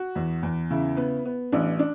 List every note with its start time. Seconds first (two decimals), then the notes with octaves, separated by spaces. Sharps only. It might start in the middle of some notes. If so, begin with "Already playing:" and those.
Already playing: F#4
0.15 E2
0.43 E2
0.71 C#3 E4
0.97 B3
1.25 B3
1.52 A1 D4
1.79 D4